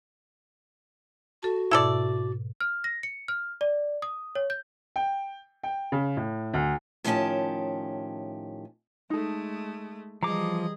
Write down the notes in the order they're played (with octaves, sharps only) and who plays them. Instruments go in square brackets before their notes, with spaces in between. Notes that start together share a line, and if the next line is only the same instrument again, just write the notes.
[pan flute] F#4 [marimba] A4 A5
[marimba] G#2 B2 [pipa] E4 A4 D5
[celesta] F6
A#6
C#7
F6
D5
D#6
C#5
G6
[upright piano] G5
G5
C#3
A2
D2
[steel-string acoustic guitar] A2 D#3 F3 C#4 G4 A5
[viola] G#3 A3 [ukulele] D#4 A4
[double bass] E3 G3 [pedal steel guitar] F3 D6 [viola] G#4 D#5 [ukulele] A#5